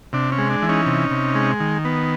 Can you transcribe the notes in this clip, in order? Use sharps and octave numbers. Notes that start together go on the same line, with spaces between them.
C3 D4
C#4
G#3
D4
E3
C#4 D#4
C3
C3
G#3
D#3
B3